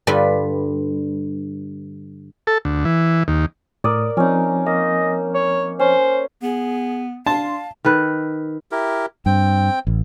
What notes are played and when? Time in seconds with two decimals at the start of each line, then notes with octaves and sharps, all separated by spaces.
0.07 G2 D3 G3 F4 B4
2.47 A4
2.65 D2
2.85 E3
3.28 D#2
3.84 A2 A#4 D5 D#6
4.17 F3 C4 C#4 D#4
4.66 A#3 D#5
5.34 C#5
5.79 C#4 C5
6.43 B3 G#4
7.26 D4 F5 A5 C6
7.85 D#3 A4 B4
8.72 E4 G4 A#4
9.26 G2 C4 G5
9.87 A1